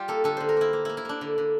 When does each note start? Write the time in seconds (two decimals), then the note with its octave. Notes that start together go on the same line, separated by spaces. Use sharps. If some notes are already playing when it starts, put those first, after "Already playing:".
Already playing: G3 F4 G4
0.08 A#3 A4
0.24 D3 A4
0.37 D3 C5
0.49 A#4
0.57 A#3 E4
0.73 A#3
0.85 A#3 E4
0.97 E4
1.05 A#3 D4
1.21 D3
1.38 D3